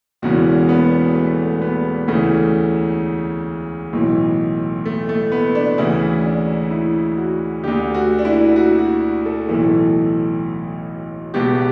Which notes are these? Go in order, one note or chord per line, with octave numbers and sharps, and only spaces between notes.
E1 E2 C#3 E3 F#4
B3
A3
B3
D2 C#3 E3 A3
B1 A2 E3
A3
A3
B3
D4
D2 C#3 E3 E4
D4
E4
F#4
D2 D3 G4
F#4
D4
E4
F#4
F#4
A4
B1 A2 E3 A4
C#2 B2 G4